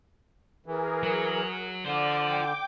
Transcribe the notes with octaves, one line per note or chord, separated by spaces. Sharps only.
E3 G#4 A#4
F#3
D3 F4 C5 D5 D6
G5 D6